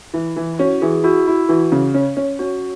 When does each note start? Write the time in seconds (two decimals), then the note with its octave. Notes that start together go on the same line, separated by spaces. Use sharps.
0.14 E3 E4
0.36 E3
0.54 E4
0.59 C#4 F#4
0.82 E3 G#4
1.04 E4 F#4
1.27 E4
1.49 E3 F#4
1.72 C#3
1.94 C#4
2.17 C#4
2.39 C#4 F#4